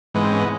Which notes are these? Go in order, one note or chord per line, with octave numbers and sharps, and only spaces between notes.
G#2 E3 G#3 B3
C4
C#4
B3